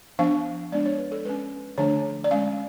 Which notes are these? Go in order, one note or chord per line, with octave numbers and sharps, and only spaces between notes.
F3 B3 D4 F5
G#3 B3 D4 D5
C#5
B4
A4
G#3 C#4 B4
D3 F3 A3 D4 C#5
D5
G#3 C#4 F5